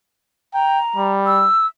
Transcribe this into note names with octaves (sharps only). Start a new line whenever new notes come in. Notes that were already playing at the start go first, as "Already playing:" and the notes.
G5 A#5
G3
E6